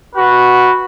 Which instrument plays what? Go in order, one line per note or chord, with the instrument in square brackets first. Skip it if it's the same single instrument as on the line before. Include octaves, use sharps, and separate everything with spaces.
[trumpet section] F#4 [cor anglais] B4